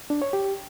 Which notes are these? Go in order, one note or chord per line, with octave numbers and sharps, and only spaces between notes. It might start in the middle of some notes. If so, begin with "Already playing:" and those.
D4
C#5
G4